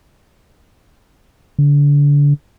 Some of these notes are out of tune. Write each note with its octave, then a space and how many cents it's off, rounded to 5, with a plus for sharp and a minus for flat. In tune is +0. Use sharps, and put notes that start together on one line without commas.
D3 -30